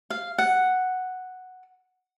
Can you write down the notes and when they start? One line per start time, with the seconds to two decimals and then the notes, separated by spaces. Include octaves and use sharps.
0.10 F5
0.38 F#5